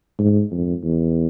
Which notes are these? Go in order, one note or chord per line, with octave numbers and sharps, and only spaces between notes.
G#2
F2
E2